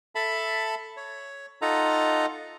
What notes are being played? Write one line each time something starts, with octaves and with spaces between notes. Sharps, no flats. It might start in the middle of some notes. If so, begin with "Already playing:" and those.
A4 E5 A5 B5
C#5
D#4 F4 A4 D#5 F#5 A#5